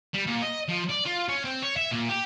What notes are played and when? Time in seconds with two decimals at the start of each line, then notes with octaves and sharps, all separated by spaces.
0.14 G3
0.27 A#2
0.42 D#5
0.69 F3
0.90 D5
1.06 F4
1.29 C#4
1.44 C4
1.63 C#5
1.77 E5
1.91 A#2
2.09 G4